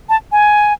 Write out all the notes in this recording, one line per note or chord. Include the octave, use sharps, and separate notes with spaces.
A5
G#5